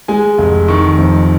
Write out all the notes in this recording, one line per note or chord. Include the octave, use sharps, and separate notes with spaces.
G#3 G#5
F1
D#3 C#6
F2